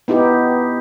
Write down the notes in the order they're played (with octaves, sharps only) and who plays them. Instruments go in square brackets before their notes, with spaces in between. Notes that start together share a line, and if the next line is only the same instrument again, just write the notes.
[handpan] B3 D#4 E4 G4